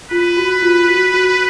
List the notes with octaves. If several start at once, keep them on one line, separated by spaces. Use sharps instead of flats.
F4 B4
F#4
F4
F#4
F#4